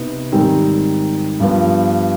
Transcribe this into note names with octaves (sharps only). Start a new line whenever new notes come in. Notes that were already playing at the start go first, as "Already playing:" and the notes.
Already playing: C3 B3 D#4
G#2 D#3 G3 C4
G2 F3 B3